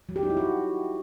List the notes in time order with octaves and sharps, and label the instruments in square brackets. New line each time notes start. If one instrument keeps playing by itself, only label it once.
[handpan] F#3
G4
D#4
E4
F#4